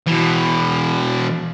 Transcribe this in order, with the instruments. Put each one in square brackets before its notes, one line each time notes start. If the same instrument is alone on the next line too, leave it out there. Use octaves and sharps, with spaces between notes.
[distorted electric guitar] B2 E3